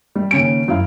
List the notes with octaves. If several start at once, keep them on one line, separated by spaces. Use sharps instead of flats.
G3
D#2 C#3 C#4 D7
F#2 E4 F5